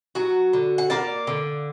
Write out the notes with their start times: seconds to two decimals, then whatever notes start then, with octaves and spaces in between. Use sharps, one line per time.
0.15 F#3 F#4
0.53 D3
0.78 F#5
0.90 A#3 D5 F5
1.27 D3